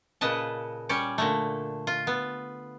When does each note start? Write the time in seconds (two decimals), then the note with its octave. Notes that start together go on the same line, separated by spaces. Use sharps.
0.21 A#2 C#3 B4 D#5 A5
0.89 G3 C#4 C#5 D5
1.18 A#2 D3 A3
1.87 F4
2.07 B3